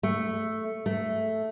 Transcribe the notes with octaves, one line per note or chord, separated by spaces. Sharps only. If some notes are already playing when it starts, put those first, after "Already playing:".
A3
A3